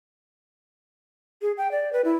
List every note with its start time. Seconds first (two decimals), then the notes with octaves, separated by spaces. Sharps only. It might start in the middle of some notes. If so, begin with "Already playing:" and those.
1.42 G#4
1.57 G5
1.71 D5
1.93 B4
2.05 E4